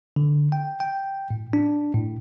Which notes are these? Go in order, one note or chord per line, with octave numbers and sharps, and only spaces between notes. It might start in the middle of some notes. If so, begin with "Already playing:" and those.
D3
G5
G5
A2
D4
A2